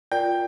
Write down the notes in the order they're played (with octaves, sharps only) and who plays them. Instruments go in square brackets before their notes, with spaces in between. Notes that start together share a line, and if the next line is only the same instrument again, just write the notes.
[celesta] F4 A#4 D5 [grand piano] G5 G6